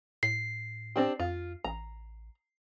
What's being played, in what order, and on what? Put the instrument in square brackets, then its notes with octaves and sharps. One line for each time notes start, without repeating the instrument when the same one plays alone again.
[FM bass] A2 [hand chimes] C7
[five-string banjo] C4 D4 G4
[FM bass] F2 [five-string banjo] F4
[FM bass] A1 [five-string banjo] A#5